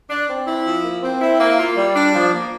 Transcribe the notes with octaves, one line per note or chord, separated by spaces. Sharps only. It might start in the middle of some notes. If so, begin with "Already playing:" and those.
D4
C4
E4
F3
A#3
C4
E4
A#3
F4
G3
D4
F3
A#3